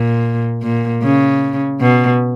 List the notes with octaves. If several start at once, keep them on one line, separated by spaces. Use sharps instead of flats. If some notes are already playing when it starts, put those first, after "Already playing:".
Already playing: A#2
A#2
C#3
B2